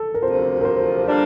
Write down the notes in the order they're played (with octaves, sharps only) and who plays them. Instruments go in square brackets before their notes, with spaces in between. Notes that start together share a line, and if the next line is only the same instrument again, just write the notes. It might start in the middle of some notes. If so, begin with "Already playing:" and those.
Already playing: [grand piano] A4
A#4
[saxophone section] D2 C3 F3 C4 F4 [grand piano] C5
[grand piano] A#4
C5
[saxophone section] D3 G3 A#3 D4